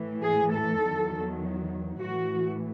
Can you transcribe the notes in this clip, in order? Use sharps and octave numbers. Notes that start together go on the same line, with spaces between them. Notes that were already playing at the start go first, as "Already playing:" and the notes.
Already playing: A2 E3
G#4
A4
E2 D#3 F#3
A2 E3 F#4